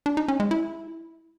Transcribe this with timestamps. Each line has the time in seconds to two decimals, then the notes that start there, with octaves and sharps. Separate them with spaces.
0.06 D4
0.17 D#4
0.28 C#4
0.40 G#3
0.51 E4